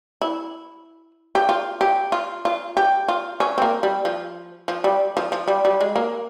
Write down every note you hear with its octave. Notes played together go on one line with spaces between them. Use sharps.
E4
G4
F4
G4
F4
F4
G4
F4
C#4
C4
A#3
G3
F3
F3
G3
F3
F3
G3
G3
G#3
A#3